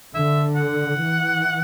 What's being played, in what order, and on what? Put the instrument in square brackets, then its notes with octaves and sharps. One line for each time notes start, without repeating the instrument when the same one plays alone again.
[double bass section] D3 [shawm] E5
[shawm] F#5
[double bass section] E3